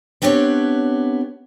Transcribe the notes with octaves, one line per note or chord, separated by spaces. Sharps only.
B3 C4 D4 G4 C#5